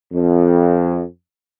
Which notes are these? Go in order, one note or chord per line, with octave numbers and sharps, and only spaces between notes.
F2